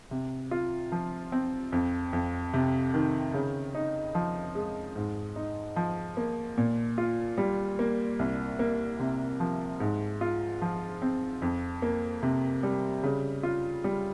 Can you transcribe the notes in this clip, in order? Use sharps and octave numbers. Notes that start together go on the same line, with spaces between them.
C3
F4
F3
C4
F2
F2
C3
D#3
C#3
D#4
F3
G#3
G#2
D#4
F3
A#3
A#2
F4
G3
A#3
C2
A#3
C3
F3
G#2
F4
F3
C4
F2
A#3
C3
G3
C#3
F4
G3